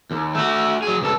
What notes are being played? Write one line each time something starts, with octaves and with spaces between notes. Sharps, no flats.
D#2
A3 F#4
F#3 G#4
C#2 A4